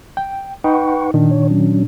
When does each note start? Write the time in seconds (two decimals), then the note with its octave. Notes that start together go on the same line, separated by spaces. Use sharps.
0.17 G5
0.64 D#4 B4 F#5 G5 B5 C#6
1.14 A#2 D#3 D4
1.31 C#5
1.50 F#3 C#4